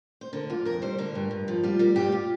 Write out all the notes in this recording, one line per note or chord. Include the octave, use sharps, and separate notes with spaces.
C5
D3 A#4
F2 F4
F2 A#4
G3 C5
D3 A#4
G2
G2
F3
G3 F4
G3 A#4
G2 G4
F4